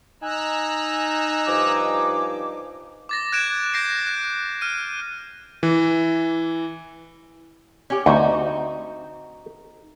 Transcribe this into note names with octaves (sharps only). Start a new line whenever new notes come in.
D#4 G#5 A#5 E6 F#6
G2 F3 D6
D6 A6 A#6
F#6 G#6 D7 E7
G6 A#6 C7 D7
F#6
F6 D#7
E3
C#4 G4
D2 C4 D#4 F#4